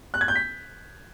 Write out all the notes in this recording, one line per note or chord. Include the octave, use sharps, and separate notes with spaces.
F#6
G#6
G6
B6